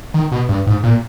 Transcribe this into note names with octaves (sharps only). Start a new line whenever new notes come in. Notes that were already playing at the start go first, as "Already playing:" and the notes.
D#3
B2
G2
G#2
A#2